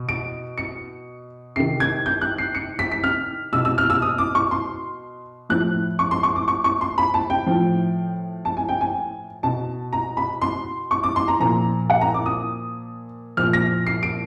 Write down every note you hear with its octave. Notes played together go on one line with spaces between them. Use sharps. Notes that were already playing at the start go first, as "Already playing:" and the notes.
Already playing: B2
D7
C#7
C3 D#3 C7
G#6
G6
F#6
C7
C#7
B6
B6
F6
B2 E6
E6
F6
E6
D#6
D6
C#6
C6
A2 F3 F#6
C#6
C6
C#6
D6
C#6
C#6
C6
B5
A5
G5
A2 F3
A5
G#5
G5
G#5
B2 A5
A#5
B5
C6
C#6
D6
C6
A#5
A#2 F3 A#5
F#5
A#5
D6
D#6
A#2 F3 F6
A#6
C7
D7